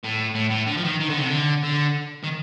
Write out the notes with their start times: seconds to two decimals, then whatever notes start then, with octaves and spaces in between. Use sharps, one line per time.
0.04 A2
0.35 A2
0.51 A2
0.67 D3
0.77 F3
0.84 D#3
1.00 D#3
1.09 D3
1.18 C3
1.27 D3
1.64 D3
2.24 D#3